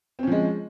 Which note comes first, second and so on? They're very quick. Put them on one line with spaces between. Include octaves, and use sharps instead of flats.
C4 C#4 F3 G#3